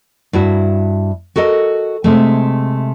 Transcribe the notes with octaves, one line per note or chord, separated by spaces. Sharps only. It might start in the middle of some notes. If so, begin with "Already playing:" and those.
G2 E4 F#4
F#4 A4 A#4 D#5
C3 G#3 A3